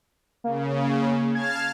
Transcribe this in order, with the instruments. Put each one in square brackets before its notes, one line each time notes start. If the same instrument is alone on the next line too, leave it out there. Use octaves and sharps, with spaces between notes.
[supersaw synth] C#3 [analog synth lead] A#3
[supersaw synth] F5 A5 F6 [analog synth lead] G#6